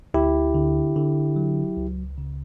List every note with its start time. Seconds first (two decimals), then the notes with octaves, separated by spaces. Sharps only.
0.14 D2 E4 G4
0.54 D3
0.96 D3
1.36 F#3
1.77 C#2
2.18 C#3